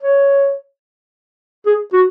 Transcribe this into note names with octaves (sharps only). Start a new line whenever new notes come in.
C#5
G#4
F#4